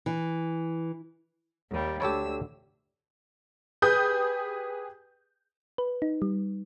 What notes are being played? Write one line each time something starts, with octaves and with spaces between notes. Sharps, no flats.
E3
D#2 G3
D2 G4 A4 C#5 E6
G4 G#4 B4 D#6 G6
B4
D#4
G3